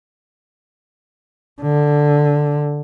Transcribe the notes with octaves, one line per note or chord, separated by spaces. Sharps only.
D3